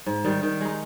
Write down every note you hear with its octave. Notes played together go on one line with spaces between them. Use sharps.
G#2
D#3 G3
D#3
G#3 D#4